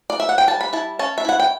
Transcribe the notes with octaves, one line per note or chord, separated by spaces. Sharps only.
D5
E5
F#5
G5
G3 A5
B5
E4 A5
C#4 A5
E5
E4 F#5
G5